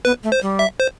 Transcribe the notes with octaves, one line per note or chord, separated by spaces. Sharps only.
B3 B4
A3
C5
G3
E5
C5